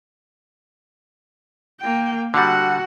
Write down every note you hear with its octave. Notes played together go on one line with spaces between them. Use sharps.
A#3 G5
D3 G3 F#4 F#5